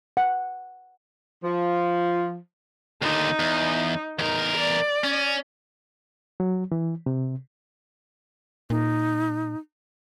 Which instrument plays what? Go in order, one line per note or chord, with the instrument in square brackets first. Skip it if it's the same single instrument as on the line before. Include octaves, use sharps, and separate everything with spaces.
[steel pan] F#5
[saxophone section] F3
[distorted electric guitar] D#2 D3 [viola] D#4
[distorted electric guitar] E2
[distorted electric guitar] E2 A#4 [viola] D#4
[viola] D5
[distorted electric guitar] C#4
[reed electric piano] F#3
E3
C3
[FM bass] A#2 [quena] D#4